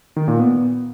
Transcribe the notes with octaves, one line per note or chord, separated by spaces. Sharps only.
D#3
A#2
B3